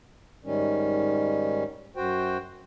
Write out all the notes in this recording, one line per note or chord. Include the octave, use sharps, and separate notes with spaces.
G#2 D#3 G3 C#4
F#2 F#4 C5 G5